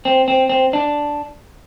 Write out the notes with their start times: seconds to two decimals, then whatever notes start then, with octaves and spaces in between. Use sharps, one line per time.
0.05 C4
0.28 C4
0.49 C4
0.73 D4